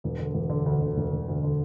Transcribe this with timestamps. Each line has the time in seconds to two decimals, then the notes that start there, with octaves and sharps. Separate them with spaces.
0.04 E1
0.19 D3
0.34 E1
0.50 D3
0.66 D2
0.81 D3
0.96 E1
1.12 E1
1.28 D2
1.43 D3